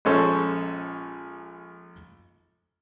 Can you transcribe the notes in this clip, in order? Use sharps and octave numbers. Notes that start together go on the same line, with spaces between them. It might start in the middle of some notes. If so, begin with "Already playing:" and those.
A#1 G#3 C#4 A4 C5